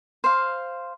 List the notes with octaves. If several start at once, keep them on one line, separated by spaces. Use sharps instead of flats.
C5 F5